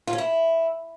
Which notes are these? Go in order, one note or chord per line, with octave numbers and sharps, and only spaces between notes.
F4
C#4
E4